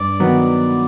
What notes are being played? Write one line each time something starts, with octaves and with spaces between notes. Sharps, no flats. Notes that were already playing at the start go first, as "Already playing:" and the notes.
Already playing: G2 D5
D#3 F#3 B3